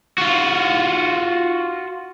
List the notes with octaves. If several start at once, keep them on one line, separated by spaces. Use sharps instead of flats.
F4 F#4